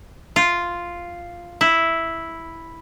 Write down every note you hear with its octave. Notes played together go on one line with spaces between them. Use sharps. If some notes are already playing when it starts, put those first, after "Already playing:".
F4
E4